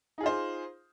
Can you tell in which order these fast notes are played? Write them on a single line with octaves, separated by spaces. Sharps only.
D#4 G#4 F4 C5